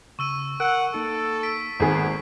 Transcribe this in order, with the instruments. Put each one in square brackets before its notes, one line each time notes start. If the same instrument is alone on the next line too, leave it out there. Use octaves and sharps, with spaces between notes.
[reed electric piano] C#3 [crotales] C#6 E6 D#7
[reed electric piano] A#4 E6 F#6 [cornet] F#5 [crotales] D7
[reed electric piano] A#3 D#4 [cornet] A4
[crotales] B6 D7
[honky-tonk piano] G#1 G#4 [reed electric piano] G#3 A#3 C5 [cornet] B3